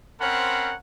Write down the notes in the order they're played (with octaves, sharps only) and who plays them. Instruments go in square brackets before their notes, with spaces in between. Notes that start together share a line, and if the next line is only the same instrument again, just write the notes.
[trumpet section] C4 C#4 A#4 C5 F#5 B5